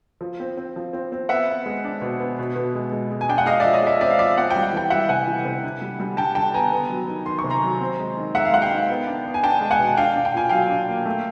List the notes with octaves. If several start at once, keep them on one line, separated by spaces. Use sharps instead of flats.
F3
C4
C4
F3
C4
C4
B3 E5 F#5
B3
G#3
D4
B2
B3
B2
B2
G#3
G#3
G#3
G#5
D4 G5
F#5
G#3 D#5 F5
F3 D5 E5
C#5 D#5
G#3 D5 E5
C4 D5 E5
F5
F3 D5 E5
C4 F#5
G5
G3
F#5
E3 G5
G3 E5 F#5
C3 F#5 G#5
E3
C3
D3
G3
G3
D3 G5 A5
D3 G5 A5
B3 G#5 A#5
B3
F#3
D#3
D#3 C6
C#6
C3
A#5 C6
F#3
C4
G#3
D#3
G#3 E5 F#5
F5
G#3 F#5
F5 G5
D#3
B3
D4
B3
G#5
D4 G5 A5
G#3
F#5 G#5
B2
D4 F5 G5
D4
G5
A#2 G#5
F#3 F5 G5
D4
A#3
A3